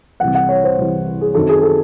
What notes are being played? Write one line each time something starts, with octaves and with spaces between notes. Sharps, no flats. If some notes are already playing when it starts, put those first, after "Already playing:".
C2 C3 E3 F#5
F#5
C#5
C5
C2 C3 E3
G#4
F#2 D#3 F#3 C4 D#4 A4
G#4
A4